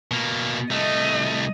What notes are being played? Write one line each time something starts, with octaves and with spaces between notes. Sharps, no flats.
B2 A#3
C2 A3 D#5